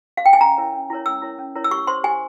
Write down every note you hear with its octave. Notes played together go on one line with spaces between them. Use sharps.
F5
G5
G#5
C#4 A#5
E4 A#4 C#5
C#4
E4 A#4 C#5
C#4 E6
E4 A#4 C#5
C#4
E4 A#4 C#5
E6
G4 C#6
C5 C6
G4 G#5